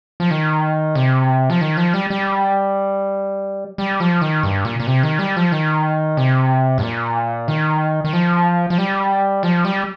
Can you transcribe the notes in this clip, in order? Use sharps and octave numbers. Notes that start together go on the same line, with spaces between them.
F3
D#3
C3
F3
D#3
F3
G3
G3
G3
F3
D#3
G2
A#2
A#2
C3
D#3
G3
F3
D#3
C3
G2
A#2
D#3
D#3
F3
F3
G3
F3
G3